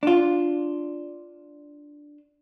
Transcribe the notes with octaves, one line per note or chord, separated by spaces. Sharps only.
D4 F4